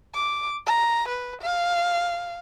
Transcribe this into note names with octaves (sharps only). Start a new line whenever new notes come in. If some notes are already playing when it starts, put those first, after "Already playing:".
D6
A#5
B4
F5